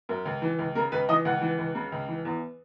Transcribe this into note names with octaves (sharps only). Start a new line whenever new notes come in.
F#2
C#2
E3
C#2
C#3 A#4
C#2 B4
E3 D#5
C#2 F#5
E3
C#2
C#3
C#2
E3
E2